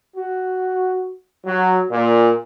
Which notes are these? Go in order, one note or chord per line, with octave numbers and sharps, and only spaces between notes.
F#4
F#3
A#2